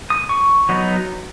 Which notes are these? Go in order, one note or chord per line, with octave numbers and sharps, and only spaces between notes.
D#6
C#6
F#3 B3 D#4